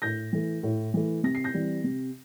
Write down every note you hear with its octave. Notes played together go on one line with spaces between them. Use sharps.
A2 G6 A#6
E3 A3
A2
E3 A3
C3 A#6
C7
G6 A#6
E3 G3 C4
C3